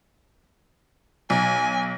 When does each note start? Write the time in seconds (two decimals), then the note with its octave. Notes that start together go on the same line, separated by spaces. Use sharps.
1.30 B1 G#5